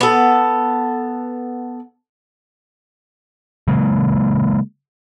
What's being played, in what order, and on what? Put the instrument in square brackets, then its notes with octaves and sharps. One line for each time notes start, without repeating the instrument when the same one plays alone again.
[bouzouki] B3 A4
[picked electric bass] C#3 F#3 G#3 A#3